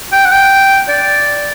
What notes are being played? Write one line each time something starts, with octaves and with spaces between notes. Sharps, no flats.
G5
F#5
G5
D5